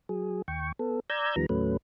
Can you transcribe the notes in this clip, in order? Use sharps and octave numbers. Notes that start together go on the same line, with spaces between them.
F#3 G#4
D#2 G5 C#6
B3 A4
D5 A#5 E6 G6 G#6
D#2 D#3 F3 G3 B3 A#5
D#2 A2 F#3 A3 C#4 B4